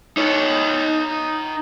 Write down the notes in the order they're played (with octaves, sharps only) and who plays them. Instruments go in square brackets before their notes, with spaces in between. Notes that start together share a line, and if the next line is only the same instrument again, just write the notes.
[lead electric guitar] D#4 C#5